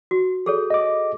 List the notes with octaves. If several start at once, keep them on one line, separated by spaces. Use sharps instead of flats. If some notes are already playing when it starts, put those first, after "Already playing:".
F#4
G#4 A4 C#5
D#5 D6